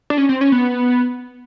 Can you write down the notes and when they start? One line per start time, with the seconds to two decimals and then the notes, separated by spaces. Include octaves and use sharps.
0.10 D4
0.18 C#4
0.29 C4
0.41 C#4
0.52 B3